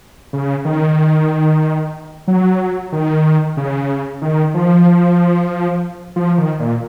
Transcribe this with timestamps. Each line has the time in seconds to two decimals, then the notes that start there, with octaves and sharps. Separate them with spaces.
0.33 C#3
0.65 D#3
2.27 F#3
2.92 D#3
3.57 C#3
4.22 D#3
4.54 F3
6.16 F3
6.38 D#3
6.59 A#2